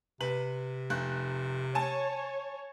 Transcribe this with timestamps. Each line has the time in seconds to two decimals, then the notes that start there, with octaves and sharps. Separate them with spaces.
0.20 C3 B4 F#7
0.90 F1 F#6
1.75 C#5 G#5 A5